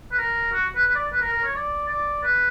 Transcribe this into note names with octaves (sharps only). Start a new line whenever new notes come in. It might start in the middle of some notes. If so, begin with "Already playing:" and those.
B4
A#4
F#4
B4
B4
D5
B4
A#4
A#4
C#5
D5
D5
B4